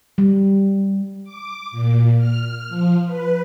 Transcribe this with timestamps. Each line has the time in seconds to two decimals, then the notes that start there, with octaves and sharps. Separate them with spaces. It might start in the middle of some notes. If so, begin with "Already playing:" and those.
0.18 G3
1.24 D6
1.71 A#2
2.18 F6
2.69 F3
3.06 B4